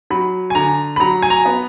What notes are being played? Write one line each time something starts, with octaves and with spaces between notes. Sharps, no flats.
F#3 B5
G#5
D3 A#5
B5
F#3 A#5
G#5
A#5
B3